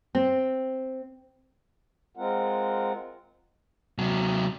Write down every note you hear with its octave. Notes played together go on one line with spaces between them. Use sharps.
C4
G#3 C4 F4 A#4 F#5
C3 F#3